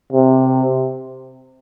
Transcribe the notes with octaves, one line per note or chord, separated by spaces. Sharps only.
C3